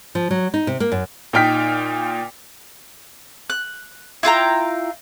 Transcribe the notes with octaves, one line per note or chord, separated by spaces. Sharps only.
F3
F#3
D#4
C3
A#3
F#2
A#2 D#4 G5 F6 B6
F#6
E4 F4 G5 A#5